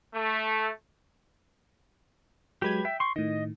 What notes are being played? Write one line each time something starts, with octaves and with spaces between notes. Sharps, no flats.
A3
F#3 G#3 G4 B4 G#6
E5 G5
C6 C#6
A2 D#3 D#5